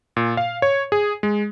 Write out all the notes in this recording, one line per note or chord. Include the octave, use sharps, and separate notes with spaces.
A#2
F5
C#5
G#4
G#3